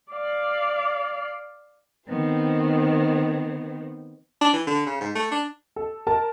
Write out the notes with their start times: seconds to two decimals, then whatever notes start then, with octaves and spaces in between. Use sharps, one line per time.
0.12 D5 F5
2.08 D#3 B3 C4 C5
4.41 D4
4.53 E3
4.67 D3
4.87 C#3
5.01 G#2
5.15 A3
5.32 D4
5.76 A4
6.07 A#4 A5